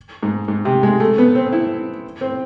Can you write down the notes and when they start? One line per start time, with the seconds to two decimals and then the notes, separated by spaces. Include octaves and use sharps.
0.23 G#2
0.48 G#2
0.65 C3
0.83 G#3
1.00 A3
1.18 B3
1.35 C4
1.52 E4
2.21 C4